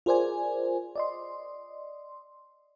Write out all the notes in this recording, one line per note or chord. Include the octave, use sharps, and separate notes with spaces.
F4 G#4 A#4 C5 D5 G#5
D5 D#5 C6